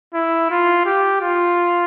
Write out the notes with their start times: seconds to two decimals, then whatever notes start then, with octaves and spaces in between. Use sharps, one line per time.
0.14 E4
0.51 F4
0.86 G4
1.22 F4